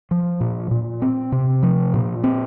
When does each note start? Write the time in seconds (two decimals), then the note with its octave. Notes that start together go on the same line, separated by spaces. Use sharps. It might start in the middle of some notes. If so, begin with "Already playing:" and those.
0.11 F3
0.40 A#2
0.71 A#2
1.02 C4
1.32 C3
1.63 F3
1.94 A#2
2.24 C4